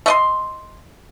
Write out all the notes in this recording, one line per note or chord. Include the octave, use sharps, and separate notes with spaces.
A3 D#5 C6